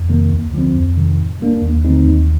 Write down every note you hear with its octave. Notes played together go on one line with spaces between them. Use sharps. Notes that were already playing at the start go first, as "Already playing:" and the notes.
Already playing: F2
C3 D#3 A#3
D2
D3 F3 C4
F2
C3 D#3
A2
G3 A#3 D4
D#2
D3 A3 C4 D#4
D#2